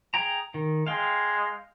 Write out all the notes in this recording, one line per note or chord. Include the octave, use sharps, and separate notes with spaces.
G#4 G5 A#5
D#3
G#3 F5 G5